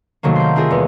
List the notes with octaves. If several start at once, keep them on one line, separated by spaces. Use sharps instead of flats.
C3 D#3 F#3 A3 A#3
C6 G6
C4 E4 F4 G#4 A#4
E2 G#3 B3